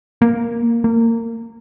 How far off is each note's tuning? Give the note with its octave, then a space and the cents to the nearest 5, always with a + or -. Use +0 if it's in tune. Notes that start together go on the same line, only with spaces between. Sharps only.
A#3 +0
A#3 -25